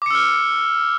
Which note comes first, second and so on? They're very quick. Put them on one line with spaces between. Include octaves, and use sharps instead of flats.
D6 C#7 E6 F6